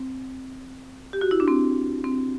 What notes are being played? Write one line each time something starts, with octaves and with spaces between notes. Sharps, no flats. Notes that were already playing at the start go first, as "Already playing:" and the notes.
Already playing: C4
G4
F#4
E4
D4
C4
C4